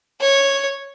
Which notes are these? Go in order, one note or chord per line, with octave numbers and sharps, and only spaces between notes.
C#5